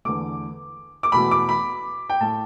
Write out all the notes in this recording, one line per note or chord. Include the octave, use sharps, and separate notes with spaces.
E2 D3 A3 D6
D6
E2 B2 A3 B5
D6
B5
G5
A2 A3 A5